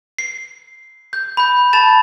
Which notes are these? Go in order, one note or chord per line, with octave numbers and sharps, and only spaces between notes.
C7
G6
B5 G6
A5 B5 A6 E7